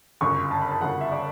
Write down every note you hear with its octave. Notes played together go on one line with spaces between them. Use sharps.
G1 F#2 C#3 C#6
A5
B5
A5
G1 F#2 C#3 F#5
E5
D5